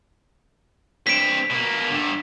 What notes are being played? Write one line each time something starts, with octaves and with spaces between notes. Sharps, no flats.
G2 C4 B6 D7
B2 A#3
G2 D3